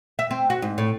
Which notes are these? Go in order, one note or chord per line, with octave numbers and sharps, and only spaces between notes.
E5
C4
F#4
G#2
A2